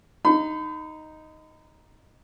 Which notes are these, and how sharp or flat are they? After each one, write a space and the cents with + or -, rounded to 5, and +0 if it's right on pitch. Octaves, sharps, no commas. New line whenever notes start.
D#4 +0 B5 +45